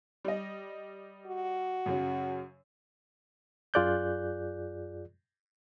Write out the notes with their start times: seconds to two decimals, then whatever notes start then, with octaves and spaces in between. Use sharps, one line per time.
0.24 G3 D#5
1.26 F#4
1.86 F#2 C#3 F#3
3.74 F#2 F4 G#4 D5 F#6 G6